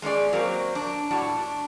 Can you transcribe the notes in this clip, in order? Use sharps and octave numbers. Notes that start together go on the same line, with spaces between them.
G#3 C#4 G#4 D5
F#3 A#3 C4
D4
A2 G3 F#4
D4